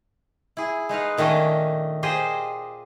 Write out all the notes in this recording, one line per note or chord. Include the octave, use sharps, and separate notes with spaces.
E4 G#4
G#3 D#4 B4 F5
A#2 D#3 A3 C#4 D4 D#5
F4 G4 G#4 C5 D#5